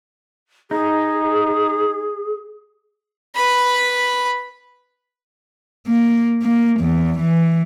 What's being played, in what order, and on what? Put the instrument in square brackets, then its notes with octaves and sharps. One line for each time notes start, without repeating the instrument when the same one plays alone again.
[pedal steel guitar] D#4 [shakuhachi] G#4
[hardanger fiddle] B4 B5
[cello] A#3
A#3
E2
E3